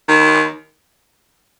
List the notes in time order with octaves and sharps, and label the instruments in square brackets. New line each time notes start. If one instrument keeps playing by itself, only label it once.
[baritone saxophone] D#3